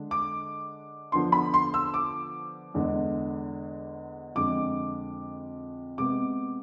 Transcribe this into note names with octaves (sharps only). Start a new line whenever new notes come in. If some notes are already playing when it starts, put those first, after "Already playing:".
Already playing: D3 G#3 D4
D6
D3 F3 B3 D4 C6
B5
C6
E6
D6
E2 D3 G#3
F2 D3 G#3 D6
C3 G#3 B3 D6